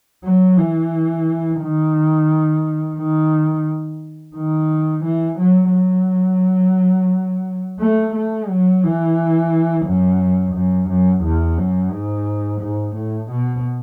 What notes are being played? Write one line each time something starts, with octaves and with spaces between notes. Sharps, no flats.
F#3
E3
D#3
D#3
D#3
E3
F#3
F#3
A3
A3
F#3
E3
F#2
F#2
F#2
E2
F#2
G#2
G#2
A2
B2